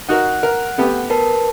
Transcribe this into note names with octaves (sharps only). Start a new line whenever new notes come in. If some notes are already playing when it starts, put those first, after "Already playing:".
D#4 F#4 A#4 F#5 F#6
A#4
A3 B3 G4
A#4 B4 A5